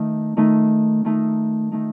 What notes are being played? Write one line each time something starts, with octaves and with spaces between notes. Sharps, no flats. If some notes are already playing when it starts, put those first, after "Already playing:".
Already playing: D#3 A3 D#4
D#3 A3 D#4
D#3 A3 D#4
D#3 A3 D#4